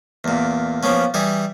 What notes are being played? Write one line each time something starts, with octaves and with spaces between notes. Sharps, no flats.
E2 A#2
F3 A#3 B3 C#4
E3 G3 G#4